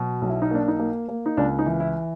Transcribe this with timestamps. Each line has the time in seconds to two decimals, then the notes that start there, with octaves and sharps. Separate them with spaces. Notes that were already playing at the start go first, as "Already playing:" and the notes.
Already playing: B2 F#3
0.22 B1
0.29 E4
0.42 D#4
0.51 A#3 D4
0.68 D#4
0.79 A#3
1.09 A#3
1.26 D#4
1.37 C#2 D4
1.59 D#4
1.66 E3
1.80 E4